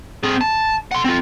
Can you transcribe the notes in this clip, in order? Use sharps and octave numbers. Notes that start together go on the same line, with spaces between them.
C4 G#4
A5
F#5 C6
C4 F4